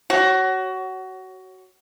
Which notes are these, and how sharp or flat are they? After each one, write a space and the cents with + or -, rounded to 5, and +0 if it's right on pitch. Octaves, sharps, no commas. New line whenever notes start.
F#4 +20 C#5 -10